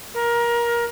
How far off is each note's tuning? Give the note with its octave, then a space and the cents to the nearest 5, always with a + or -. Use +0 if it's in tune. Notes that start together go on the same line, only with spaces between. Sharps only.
A#4 +20